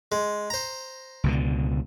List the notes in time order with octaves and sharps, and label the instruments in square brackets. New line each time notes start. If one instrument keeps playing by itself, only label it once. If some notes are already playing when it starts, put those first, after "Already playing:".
[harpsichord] G#3
C5 A#5
[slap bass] C#2 B2 D3